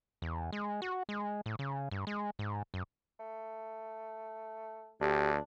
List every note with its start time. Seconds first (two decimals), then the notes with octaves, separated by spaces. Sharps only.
0.22 E2
0.53 G#3
0.82 F#4
1.09 G#3
1.46 A2
1.59 C#3
1.91 G2
2.07 G#3
2.39 G#2
2.74 F#2
3.19 A3
5.01 D2 D4 G4